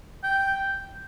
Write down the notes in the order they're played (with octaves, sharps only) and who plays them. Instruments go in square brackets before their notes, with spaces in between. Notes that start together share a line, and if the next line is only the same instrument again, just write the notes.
[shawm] G5